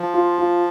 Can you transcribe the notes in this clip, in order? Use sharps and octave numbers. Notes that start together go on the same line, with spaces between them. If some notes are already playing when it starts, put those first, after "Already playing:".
Already playing: F3
F4
F4